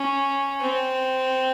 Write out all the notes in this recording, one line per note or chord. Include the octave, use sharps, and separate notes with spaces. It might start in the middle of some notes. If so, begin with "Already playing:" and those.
Already playing: C#4
C4